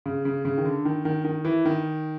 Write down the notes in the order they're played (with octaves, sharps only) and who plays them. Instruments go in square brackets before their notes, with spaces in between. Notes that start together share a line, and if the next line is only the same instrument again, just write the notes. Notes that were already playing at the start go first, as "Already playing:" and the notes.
[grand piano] C#3
C#3
C#3
D#3
D3
D#3
D#3
D#3
E3
D#3